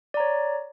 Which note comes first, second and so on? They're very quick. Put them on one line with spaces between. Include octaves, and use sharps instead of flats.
D5 A#5 C#5